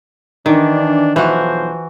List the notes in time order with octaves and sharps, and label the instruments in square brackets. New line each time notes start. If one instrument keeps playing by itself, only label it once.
[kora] D#3 [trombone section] E3 D4
[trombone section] B1 F3 C5 [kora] E3 F#4